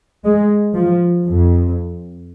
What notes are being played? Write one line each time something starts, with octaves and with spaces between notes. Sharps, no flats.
G#3
F3
F2